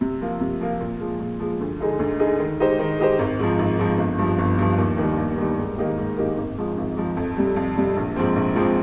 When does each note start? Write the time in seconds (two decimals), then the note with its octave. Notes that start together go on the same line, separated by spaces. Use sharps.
0.01 C3
0.21 F3 A#3 F4
0.41 C3
0.61 F3 A#3 F4
0.80 A#2
1.00 F3 G#3
1.20 A#2
1.40 F3 G#3
1.61 D2
1.80 D3 G#3 D#4 G#4
1.99 D2
2.20 D3 G#3 D#4 G#4
2.39 D#3
2.60 G#3 D#4 G4 C5
2.79 D#3
2.99 G#3 D#4 G4 C5
3.19 G#1
3.39 G#2 F3
3.59 G#1
3.79 G#2 F3
3.98 G1
4.18 G2 F3
4.38 G1
4.58 G2 F3
4.78 D#2
4.98 D#3 G3
5.18 D#2
5.38 D#3 G3
5.58 G#2
5.78 D#3 A#3 D#4 G4
5.98 G#2
6.17 D#3 A#3 D#4 G4
6.38 G#1
6.57 G#2 F3 G#3
6.77 G#1
6.96 G#2 F3 G#3
7.17 F2
7.36 C3 G3
7.56 F2
7.76 C3 G3
7.96 A#1
8.16 G#2 F3 C4
8.36 A#1
8.55 G#2 F3 C4